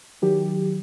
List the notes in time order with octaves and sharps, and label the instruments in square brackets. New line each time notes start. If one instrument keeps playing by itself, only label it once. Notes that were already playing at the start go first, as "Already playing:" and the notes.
[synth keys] D#3 F#3 G4